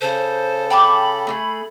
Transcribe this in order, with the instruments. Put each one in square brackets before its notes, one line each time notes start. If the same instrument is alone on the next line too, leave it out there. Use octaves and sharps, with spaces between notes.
[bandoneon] C#3 A4 [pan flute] C5
[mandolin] G5 A5 D6 [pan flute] B5
[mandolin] A3 F#4 G#4